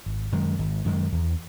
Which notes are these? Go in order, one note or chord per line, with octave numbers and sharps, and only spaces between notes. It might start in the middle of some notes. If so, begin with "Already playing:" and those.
G#1
F#2 D#3 G#3
G#1
F#2 D#3 G#3
E2